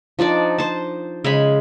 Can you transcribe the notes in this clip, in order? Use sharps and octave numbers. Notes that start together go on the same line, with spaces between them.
F3 D4 D#4 D5
C5 A5
C#3 G#3 G#4 B5